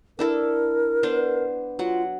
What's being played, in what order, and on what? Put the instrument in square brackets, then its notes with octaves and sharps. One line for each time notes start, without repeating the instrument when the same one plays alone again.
[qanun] D4 E4 A4 [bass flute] A#4
[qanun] B3 D4 C5
[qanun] F#3 F#5 [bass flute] F4